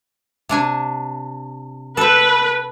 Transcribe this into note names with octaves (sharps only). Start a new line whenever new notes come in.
C3 D4 G#5
A4 B4 G5